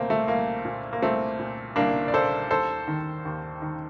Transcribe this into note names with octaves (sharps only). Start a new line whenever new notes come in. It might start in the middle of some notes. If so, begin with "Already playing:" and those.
Already playing: C2 A#2 A3 A#3 C4
A3
C2 A#3
A#2
A#3
C2 A3 C4
A#2
C2 A#3 D4
D5
A#2 A4 C5
D#2 A4 C5
D#3
D#2
D#3